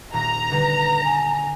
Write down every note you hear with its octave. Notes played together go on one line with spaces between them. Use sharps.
D#1 A#5
D3 G3 B4 A#6
G#5